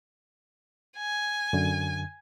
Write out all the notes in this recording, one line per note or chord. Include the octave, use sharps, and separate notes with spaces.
G#5
F#2 D3